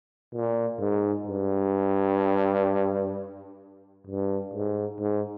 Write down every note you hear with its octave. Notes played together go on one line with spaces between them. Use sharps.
A#2
G#2
G2
G2
G#2
G#2